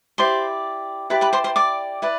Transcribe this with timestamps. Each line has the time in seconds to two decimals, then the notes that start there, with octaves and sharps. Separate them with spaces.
0.18 E4 G4 C5 D5 C6
1.10 E4 G4 B4 D5 B5
1.21 B4 B5
1.33 C5 C6
1.44 C5 C6
1.56 D5 D6
2.02 E4 B4 D5